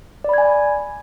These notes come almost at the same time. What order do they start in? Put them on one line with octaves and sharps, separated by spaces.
D5 B5 G#6 G#5